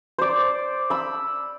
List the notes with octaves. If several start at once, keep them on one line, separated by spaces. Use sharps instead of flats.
C5 D5
B5 E6